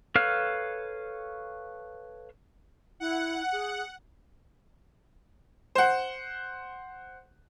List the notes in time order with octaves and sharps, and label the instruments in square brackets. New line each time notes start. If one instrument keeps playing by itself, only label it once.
[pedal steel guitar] A4 B4 C#5 F5 F6
[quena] E4 [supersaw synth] F#5
[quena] G#4
[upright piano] C5 F#5